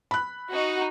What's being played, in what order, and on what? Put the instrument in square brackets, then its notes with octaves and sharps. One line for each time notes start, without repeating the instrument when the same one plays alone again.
[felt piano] B5 F#6
[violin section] D#4 F#4